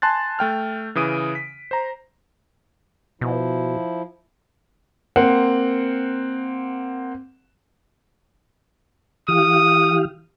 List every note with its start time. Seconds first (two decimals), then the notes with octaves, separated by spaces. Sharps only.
0.02 G#5 A5 C6 F#6 A6
0.39 A3 G5 F6
0.95 C#3 E3 D#6 D7 D#7
1.35 B6
1.71 C5 A#5
3.21 B2 F3 E4
5.16 A#3 C4 F#5
9.28 E3 G4 F5 D#6